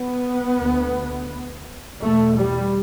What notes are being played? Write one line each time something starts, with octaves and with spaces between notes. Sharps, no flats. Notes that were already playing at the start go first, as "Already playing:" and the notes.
Already playing: B3
D2
E2 B2 A3
G3